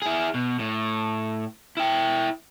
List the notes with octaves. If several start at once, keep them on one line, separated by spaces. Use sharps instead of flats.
E4 G#4
B2
A2
E4 G5